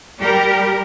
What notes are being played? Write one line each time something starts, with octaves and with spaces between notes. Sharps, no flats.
G3 G4 A#4